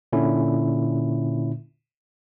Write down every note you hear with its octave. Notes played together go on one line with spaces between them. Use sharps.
A#2 D3 C#4 E4